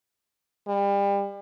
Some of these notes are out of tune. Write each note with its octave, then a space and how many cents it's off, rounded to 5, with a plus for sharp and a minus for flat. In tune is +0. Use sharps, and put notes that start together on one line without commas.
G3 +30